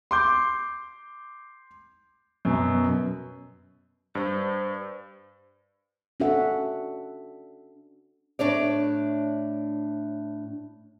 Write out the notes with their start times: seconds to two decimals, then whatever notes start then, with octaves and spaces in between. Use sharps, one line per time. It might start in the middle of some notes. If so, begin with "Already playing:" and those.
0.11 C6 D6 G6
2.45 F#2 B2
4.15 G2 C5
6.20 C#4 D4 F#4 A4 E5 F#5
8.39 A2 D4 C#5 D5